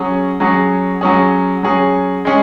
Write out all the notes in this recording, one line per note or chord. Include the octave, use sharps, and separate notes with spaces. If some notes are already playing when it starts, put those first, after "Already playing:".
Already playing: F#3 C#4 G#4
F#3 C#4 G#4
F#3 C#4 G#4
F#3 C#4 G#4
G#3 C#4 G#4